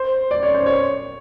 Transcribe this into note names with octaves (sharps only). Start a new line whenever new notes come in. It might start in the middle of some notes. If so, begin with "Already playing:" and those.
Already playing: C5
D5
C#5
C5
C#5